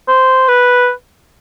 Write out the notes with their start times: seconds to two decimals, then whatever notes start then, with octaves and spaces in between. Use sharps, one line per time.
0.08 C5
0.48 B4